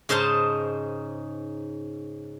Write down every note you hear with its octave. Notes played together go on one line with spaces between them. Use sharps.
G#2 C#3 D#4 C5 A5